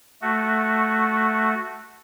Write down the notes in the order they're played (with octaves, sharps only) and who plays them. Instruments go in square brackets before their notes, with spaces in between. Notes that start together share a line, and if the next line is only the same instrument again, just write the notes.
[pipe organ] A3 F#4